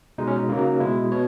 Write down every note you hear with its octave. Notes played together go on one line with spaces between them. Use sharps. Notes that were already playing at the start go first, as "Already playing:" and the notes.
B2 G#3 D#4
C#4
D#4
C#3 F#3 A#3
B2 G#3 E4
B2 C#5